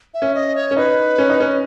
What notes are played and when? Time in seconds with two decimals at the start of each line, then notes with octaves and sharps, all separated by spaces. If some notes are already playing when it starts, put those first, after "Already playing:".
0.14 E5
0.22 C#4
0.35 D#5
0.56 C#5
0.71 C#4
0.77 D#4 B4
1.18 C#4
1.29 D#4
1.40 C#4